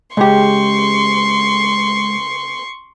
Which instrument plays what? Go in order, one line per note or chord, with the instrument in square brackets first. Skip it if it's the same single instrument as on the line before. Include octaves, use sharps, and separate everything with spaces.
[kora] C#3 G4 [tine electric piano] G#3 [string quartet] C6 C#6